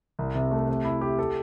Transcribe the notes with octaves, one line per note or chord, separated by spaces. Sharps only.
C2
C3
A3
C3
E4
G4
A4